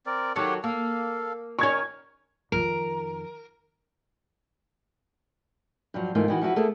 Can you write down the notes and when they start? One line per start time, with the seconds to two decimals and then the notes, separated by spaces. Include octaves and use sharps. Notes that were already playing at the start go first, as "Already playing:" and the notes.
0.06 C4 A#4 D5
0.36 D#3 F#3 G4 A4 C#5 F#5
0.64 A#3 A4 F5
1.59 D#3 C#4 A#5 C#6 G#6
1.71 A#4
2.52 F2 D#3 A#4
5.94 G2 F3 F#3
6.15 G#2 E3 A3 A#3 F4
6.28 D#3 E3 F#4
6.41 F3 E4 F#4 B4
6.56 A3 A#3 G#4 A4